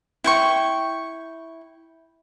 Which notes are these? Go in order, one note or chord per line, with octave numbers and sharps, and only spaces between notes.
E4 G5 C#6